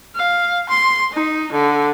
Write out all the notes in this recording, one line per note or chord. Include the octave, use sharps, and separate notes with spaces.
F5
C6
D#4
D3